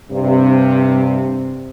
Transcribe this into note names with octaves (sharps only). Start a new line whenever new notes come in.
G2 C3